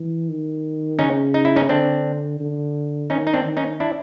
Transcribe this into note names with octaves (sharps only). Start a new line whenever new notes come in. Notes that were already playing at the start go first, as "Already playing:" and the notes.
Already playing: E3
D#3
C#3 C#4 D#4
D#4
E4
C#4 D#4
D3 C4 D4
D3
D#3 C#4 D#4
D#4
C4 D4
D#3
C#4 D#4
D4 E4